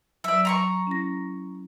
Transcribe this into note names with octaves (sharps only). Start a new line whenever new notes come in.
F#3 D5 E5
A#5 C6 C#6
C#4 E4 A#6